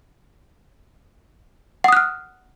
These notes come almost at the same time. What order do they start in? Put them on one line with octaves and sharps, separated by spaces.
F#5 D#6 F#6 F6